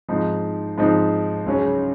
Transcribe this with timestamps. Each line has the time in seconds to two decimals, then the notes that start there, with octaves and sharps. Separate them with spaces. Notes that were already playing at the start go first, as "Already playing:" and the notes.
0.08 G#2 F3 C4 D#4
0.78 G#2 F3 C4 D#4
1.46 C#2 C#3 F#3 C#4